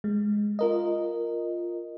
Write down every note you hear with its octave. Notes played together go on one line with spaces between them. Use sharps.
G#3
F4 A#4 D#5